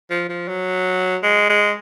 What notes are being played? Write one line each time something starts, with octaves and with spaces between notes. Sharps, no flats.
F3
F3
F#3
G#3
G#3